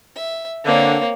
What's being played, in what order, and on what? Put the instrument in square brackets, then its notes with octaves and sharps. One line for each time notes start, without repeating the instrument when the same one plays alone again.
[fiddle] E5
[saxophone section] D3 [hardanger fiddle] A#3 [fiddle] C4 C#5